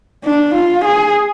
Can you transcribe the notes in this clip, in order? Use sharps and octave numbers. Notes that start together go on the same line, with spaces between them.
D4
F4
G#4